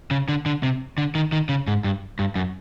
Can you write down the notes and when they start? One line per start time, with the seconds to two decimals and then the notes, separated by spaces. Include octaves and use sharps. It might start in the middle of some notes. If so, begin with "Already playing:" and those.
0.11 C#3
0.29 D3
0.46 D3
0.63 C3
0.98 D3
1.15 D#3
1.32 D#3
1.49 C#3
1.67 G#2
1.84 G2
2.19 G2
2.35 F#2